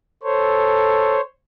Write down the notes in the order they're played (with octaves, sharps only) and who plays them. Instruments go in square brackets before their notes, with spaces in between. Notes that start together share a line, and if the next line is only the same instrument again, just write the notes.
[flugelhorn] A4 [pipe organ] C5 C#5